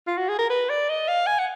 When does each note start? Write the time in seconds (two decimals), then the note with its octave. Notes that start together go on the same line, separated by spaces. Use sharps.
0.07 F4
0.17 F#4
0.29 G#4
0.39 A#4
0.50 B4
0.69 D5
0.89 D#5
1.08 F5
1.27 G#5
1.39 F#5